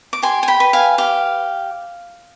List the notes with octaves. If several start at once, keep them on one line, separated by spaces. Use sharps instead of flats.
D6
G4 G#5 C6
G#5
G5 B5
B4
F5 G#5
G4 F5